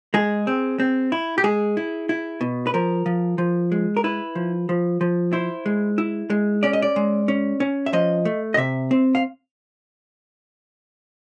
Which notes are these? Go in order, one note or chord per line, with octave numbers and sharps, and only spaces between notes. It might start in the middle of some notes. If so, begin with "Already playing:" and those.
G#3 G#4
C4
C4
E4
G4
G#3 G#4
E4
E4
B2
B4
F3 A#4
F3
F3
G#3
A#4
E4 B4
F3
F3
F3
E4 C5
G#3
E4
G#3
C#4 D5
D#5
D5
G#3
C#4
C#4
E5
F3 D#5
A3
D#5
C3 E5
C4
F5